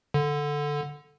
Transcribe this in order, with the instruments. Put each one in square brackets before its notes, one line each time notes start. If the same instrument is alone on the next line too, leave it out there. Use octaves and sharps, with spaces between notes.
[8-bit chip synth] D3